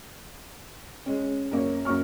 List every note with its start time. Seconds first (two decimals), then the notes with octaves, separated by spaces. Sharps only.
1.06 G#3 C#4
1.52 F#2 A#3 C#5
1.85 F#2 A#3 C#4 C#6 F6